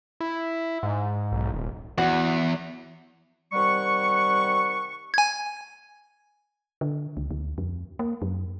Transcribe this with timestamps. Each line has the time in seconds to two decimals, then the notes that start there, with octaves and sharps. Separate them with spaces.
0.21 E4
0.83 G#2
1.32 B1
1.53 D#1
1.98 E2 F#4
3.53 C3 D#3 G3 F#5 C#6
5.14 G#5 G#6
6.81 D3
7.17 C#2
7.31 D2
7.58 F2
7.99 A#3
8.22 F#2